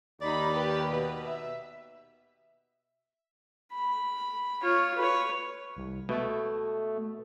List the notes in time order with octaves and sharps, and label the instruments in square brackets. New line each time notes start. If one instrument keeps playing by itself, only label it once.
[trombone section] D#2 [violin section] D#4 B5 [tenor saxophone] D5
[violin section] G4 B4
[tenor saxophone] B2 [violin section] B4
[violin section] E5
[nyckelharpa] B5
F4 C#5
B4 C#5
[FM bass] C2
[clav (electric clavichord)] B2 [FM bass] A3